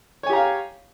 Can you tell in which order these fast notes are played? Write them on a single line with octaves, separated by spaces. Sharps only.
C#5 G#5 G4 A#5 F5